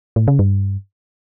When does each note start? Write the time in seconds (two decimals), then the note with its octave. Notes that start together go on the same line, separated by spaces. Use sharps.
0.16 A2
0.28 C#3
0.39 G2